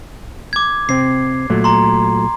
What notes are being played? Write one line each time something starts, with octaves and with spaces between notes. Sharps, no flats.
D6 G#6
C3 C4 C7
A#2 F#3 A3
A#5 C6